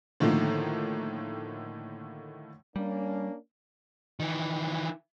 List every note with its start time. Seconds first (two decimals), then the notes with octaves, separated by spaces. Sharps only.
0.20 A2 D3 D#3 F3 A3 A#3
2.76 G3 A#3 C#4 D4
4.20 D#3 E3